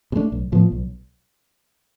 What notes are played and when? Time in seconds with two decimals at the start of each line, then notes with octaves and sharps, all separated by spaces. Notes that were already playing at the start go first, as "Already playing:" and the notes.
0.12 B2
0.16 A3 D4
0.32 B1
0.52 A2 F3 B3
0.72 B1